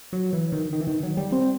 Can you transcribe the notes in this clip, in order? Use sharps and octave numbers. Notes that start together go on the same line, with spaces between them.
F#3
E3
D#3
D#3
E3
D#3
F#3
G3
C4